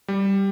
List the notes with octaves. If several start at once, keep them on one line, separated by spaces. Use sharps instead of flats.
G3